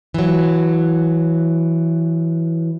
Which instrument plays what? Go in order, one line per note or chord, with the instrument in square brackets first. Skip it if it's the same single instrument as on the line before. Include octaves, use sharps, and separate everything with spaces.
[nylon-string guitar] E3 F#3